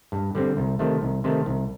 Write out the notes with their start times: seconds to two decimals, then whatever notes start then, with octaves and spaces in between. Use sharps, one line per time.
0.12 G2
0.35 D3 G3 C4
0.57 C2
0.79 C3 D#3 A3
1.02 C2
1.24 C3 D#3 A3
1.46 C2